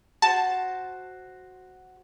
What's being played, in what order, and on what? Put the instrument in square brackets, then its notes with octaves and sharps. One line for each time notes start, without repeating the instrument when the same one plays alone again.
[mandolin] F#4 C5 [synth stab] A5